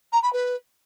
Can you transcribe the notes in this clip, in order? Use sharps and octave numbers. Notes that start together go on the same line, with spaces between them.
A#5
B5
B4